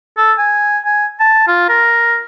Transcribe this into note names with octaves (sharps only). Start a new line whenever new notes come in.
A4
G#5
G#5
A5
F4
A#4